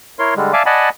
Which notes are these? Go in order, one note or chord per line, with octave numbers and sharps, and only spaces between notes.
E4 A#4 C#5 C6
D3 G3 G#3
D5 E5 F5 G#5 A5 D6
D5 D#5 F#5 G#5 A5 B5